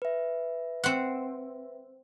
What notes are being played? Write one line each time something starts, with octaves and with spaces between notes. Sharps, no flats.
B4 E5
C4 F#5